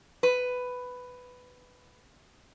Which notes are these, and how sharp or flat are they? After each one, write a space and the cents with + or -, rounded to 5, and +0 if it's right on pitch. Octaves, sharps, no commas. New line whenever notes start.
B4 +10